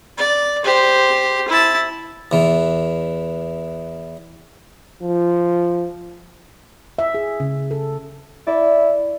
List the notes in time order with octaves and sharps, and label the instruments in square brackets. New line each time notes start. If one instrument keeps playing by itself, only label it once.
[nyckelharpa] D5
G4 C5
E4 A5
[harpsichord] E2 E3
[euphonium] F3
[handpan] E5
G#4
C#3
A4
[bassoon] E4 [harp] D5